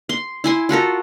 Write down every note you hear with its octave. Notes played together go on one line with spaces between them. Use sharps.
C6
E4 G#5 C6
F4 F#4 A4 A#4